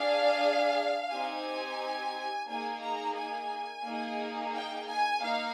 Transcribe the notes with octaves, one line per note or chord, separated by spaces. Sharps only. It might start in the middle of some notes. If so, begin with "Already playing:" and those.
Already playing: D4 G#4 F5
C4 D#4 G4 G#5
A#3 D#4 G#4 G#5
A#5
G#5
A#3 D#4 G#4
G5
G#5
A#3 D#4 F5